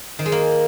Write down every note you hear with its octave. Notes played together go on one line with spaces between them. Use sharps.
D#3
G#3
A#3